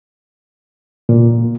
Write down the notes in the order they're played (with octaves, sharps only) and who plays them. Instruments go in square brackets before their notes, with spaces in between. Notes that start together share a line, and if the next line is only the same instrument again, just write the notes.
[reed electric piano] A#2